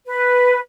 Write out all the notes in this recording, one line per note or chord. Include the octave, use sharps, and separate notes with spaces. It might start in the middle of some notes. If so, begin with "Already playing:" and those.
B4